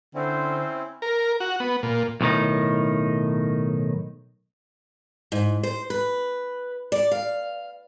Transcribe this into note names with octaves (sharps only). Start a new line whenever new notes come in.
D3 C4 C#4 E4 C5
A#4
F#4
B3
A#2
B1 A2 D#3 D#4
G#2
C5
B4
D5
F5